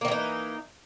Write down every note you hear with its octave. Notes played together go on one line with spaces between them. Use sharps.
D#3 E3 A#3 D#4